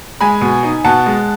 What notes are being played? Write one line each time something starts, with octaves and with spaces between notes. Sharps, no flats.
G#3 G#5 B5
B2
D#4
B2 F#5 A5
G#3